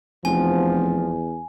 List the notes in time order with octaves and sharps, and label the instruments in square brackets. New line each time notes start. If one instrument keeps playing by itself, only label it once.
[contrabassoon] F1 [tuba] E2 [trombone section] F3 [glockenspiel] G#5